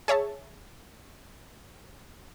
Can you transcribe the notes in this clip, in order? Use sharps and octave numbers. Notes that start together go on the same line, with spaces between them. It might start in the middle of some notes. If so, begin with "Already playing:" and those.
G#4 C#5 E5 A5